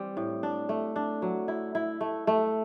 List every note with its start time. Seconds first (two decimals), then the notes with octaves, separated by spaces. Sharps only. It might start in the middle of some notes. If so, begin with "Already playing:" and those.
Already playing: E3 G3 C4
0.17 A2
0.43 D4
0.69 A3
0.96 D4
1.22 F#3
1.48 E4
1.75 E4
2.01 A3
2.27 A3